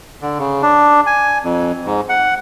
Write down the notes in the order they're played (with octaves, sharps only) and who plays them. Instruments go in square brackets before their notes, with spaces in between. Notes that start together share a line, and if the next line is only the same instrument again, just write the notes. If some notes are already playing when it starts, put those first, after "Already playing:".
[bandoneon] D3
C#3
D4
G#5
F2
G#2
F#5